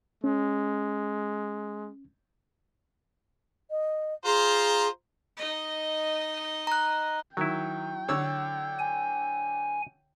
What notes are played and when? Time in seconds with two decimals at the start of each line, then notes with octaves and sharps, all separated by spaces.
0.24 G#3 C#4
3.71 D#5
4.25 F4 G#4 C5 A#5
5.37 D#4 D#5
6.67 A#5 F#6
7.37 D#3 F#3 E4 G5
8.08 D3 C#5 E6
8.79 G#5